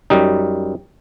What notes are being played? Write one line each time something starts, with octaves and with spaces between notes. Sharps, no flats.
F#2 G3 D#4